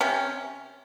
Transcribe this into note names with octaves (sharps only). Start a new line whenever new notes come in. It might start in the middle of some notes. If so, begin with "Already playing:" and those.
C3 C#4